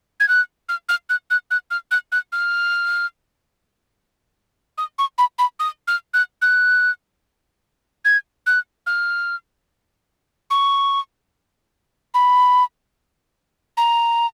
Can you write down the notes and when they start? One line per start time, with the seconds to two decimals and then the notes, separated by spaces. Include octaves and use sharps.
0.20 G#6
0.29 F#6
0.69 F6
0.89 F6
1.10 F#6
1.31 F#6
1.51 F#6
1.71 F6
1.91 F#6
2.12 F#6
2.32 F6
4.78 D#6
4.99 C#6
5.18 B5
5.39 B5
5.60 D#6
5.88 F6
6.14 F#6
6.42 F#6
8.05 G#6
8.47 F#6
8.87 F6
10.50 C#6
12.14 B5
13.77 A#5